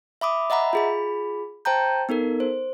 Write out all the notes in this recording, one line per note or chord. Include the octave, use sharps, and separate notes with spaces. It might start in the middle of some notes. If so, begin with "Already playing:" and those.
E5 B5 D6 D#6
D#5 E5 F#5 A#5 B5
F4 G#4 B5
C5 G5 A5 A#5 G6
B3 D#4 A4 A#4
C5